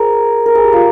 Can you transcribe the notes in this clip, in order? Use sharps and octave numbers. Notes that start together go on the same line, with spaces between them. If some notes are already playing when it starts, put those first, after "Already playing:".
Already playing: G#4 A#4 C5
A#4
G#4
G4
F4